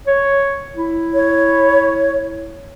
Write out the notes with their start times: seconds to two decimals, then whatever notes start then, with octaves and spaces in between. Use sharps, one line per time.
0.07 C#5
0.75 E4
1.14 C#5